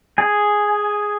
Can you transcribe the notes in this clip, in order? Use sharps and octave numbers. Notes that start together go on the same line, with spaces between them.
G#4 G#5